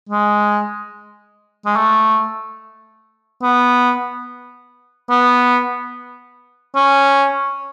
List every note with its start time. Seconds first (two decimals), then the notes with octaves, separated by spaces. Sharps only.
0.09 G#3
1.66 G#3
1.76 A3
3.43 B3
5.09 B3
6.76 C#4